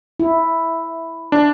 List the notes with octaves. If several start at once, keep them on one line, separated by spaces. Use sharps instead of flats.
E4
D4